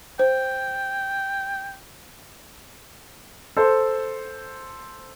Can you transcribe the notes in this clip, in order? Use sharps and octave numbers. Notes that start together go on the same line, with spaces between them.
C5 G5
A4 C5